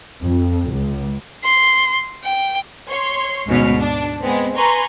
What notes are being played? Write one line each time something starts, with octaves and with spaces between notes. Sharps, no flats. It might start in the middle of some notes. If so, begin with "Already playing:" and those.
F2
C#2
C6
G5
C#5 C6
D2 G#2 B2 C#4 F6
D4
G#3 B3 C4
B4 G#5 A#5 C6 C#6